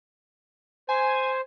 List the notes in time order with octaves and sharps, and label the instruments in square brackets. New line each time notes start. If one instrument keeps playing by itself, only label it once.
[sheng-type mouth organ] C5 [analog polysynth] G#5